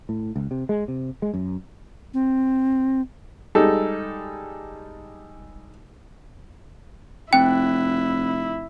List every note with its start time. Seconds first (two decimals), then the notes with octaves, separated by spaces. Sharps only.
0.09 A2
0.36 C#2
0.51 C3
0.69 G#3
0.88 C3
1.22 G#3
1.34 F#2
2.14 C4
3.55 G3 G#3 D#4 A4
7.33 F1 C4 E4 G5 F#6